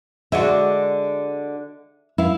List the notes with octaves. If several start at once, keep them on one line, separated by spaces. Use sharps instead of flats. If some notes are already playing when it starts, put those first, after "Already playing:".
D3 G#3 F#4 E5
E4 F5